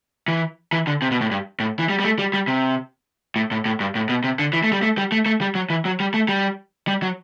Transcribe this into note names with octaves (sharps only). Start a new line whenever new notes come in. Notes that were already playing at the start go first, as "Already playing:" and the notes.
E3
E3
D3
C3
B2
A2
G2
A2
E3
G3
G3
A3
G3
G3
C3
A2
A2
A2
G2
A2
B2
C3
D3
E3
A3
G3
A3
G3
A3
A3
G3
F#3
E3
F#3
G3
A3
G3
G3
F#3